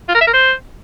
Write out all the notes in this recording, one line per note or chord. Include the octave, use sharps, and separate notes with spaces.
F4
A#4
E5
A#4
C5